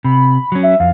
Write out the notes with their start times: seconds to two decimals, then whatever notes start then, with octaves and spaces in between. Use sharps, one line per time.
0.04 C3 B5
0.52 F#3 C#4
0.63 E5
0.80 F2 F5